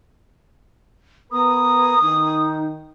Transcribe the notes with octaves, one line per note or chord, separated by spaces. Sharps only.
B3 A#4 B4 A#5 D#6
D#3 D#4